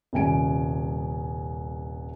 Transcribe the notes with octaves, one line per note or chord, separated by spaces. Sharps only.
D#1 C2 G#5 D7